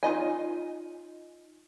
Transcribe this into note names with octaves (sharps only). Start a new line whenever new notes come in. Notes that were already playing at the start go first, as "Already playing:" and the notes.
D#4 F4 D#5 G#5